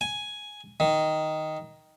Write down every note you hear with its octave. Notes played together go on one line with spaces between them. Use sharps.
G#5
D#3